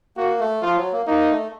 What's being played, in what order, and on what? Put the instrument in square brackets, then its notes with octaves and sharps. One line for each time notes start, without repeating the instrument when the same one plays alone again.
[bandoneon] A#3 [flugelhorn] F#4
[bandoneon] A3
[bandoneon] F3 [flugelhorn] F4
[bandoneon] F#3
A#3
[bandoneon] A#3 [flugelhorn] D#4
[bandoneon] A3